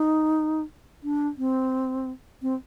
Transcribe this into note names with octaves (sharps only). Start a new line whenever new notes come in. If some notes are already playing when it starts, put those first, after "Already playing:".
Already playing: D#4
D4
C4
C4